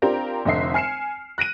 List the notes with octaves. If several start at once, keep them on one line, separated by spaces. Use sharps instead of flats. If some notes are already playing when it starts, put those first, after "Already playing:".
C4 D4 F4 G4 A#4 A#5
F1 D3 D#5 E5 C7
G#5 F6 C7 C#7 E7
F#6 A#6 D7 D#7